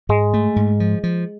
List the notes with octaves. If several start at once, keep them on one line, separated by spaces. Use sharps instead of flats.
G#2 G#3
A3
G#2
F3
F3